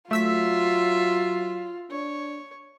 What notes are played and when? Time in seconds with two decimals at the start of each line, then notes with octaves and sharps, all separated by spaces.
0.11 F#3 A3 F4 E5 E6 B6
1.91 D4 C#5